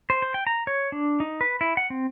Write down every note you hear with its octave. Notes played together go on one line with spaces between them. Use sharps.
C5
C5
G5
A#5
C#5
D4
D#4
B4
E4
F#5
C4